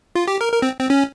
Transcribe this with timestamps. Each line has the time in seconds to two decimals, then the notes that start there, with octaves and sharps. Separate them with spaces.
0.15 F4
0.28 G4
0.41 A#4
0.52 A#4
0.62 C4
0.80 C4
0.90 C#4